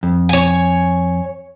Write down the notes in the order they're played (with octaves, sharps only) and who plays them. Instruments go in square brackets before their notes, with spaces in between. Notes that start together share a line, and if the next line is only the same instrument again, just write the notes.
[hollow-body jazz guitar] F2
[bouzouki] C#5 G#5